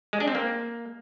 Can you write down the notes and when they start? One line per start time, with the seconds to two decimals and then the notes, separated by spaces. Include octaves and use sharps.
0.13 G#3
0.20 D4
0.28 C4
0.35 A#3